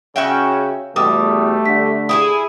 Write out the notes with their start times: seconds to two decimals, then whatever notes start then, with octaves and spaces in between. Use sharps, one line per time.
0.16 C#3 C#4 F#4 E5 G5
0.96 E2 B2 G3 A3 D6 D#6
1.66 D3 B6
2.09 E4 G4 G#4 D#6